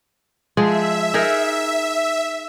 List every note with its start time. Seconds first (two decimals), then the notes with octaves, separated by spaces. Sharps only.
0.57 F3 G#3 G#4 E5
1.14 D#4 G#4 A#4